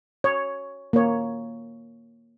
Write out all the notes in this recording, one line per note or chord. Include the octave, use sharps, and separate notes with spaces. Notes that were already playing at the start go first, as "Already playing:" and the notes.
C#5
A#3 C#5